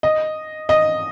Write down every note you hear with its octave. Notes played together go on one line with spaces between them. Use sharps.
D#5
D#5